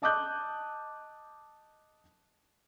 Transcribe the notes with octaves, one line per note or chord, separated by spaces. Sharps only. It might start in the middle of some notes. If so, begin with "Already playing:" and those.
D#5 A5 D6 D#6 F#6 G6